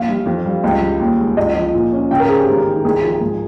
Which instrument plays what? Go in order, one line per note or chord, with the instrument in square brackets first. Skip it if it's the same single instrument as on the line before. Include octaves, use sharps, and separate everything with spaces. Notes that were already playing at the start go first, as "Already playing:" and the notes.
Already playing: [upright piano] A#1 [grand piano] F5
[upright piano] G3
F2
G3
[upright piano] C#2 [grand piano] G5
[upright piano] G3
D#2
G#3
[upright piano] C#2 [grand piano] D#5
[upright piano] F3
A#2
C#4
[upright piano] C#3 [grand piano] G5
[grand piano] A#4
[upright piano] C4 [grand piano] G#4
[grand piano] G4
[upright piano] G#1
D#3
[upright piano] C2 [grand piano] G#4
[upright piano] F3
G#2